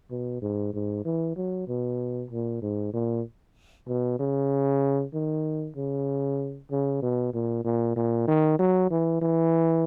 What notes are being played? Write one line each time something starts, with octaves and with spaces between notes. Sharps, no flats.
B2
G#2
G#2
E3
F#3
B2
A#2
G#2
A#2
B2
C#3
D#3
C#3
C#3
B2
A#2
A#2
A#2
D#3
F#3
E3
E3